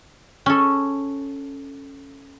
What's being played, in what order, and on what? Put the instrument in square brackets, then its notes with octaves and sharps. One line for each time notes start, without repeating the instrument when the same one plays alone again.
[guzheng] C#4 A4